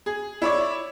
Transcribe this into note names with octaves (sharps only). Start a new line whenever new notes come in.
G#4
E4 C#5 D5